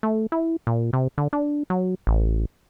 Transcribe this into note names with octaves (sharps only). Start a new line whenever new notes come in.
A3
E4
A#2
C3
D3
D4
F#3
A1